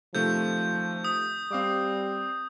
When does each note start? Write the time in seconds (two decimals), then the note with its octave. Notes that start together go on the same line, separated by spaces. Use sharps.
0.15 C3 D#3 F3 A3 G6
1.05 D#6
1.51 G3 C4 F5 D6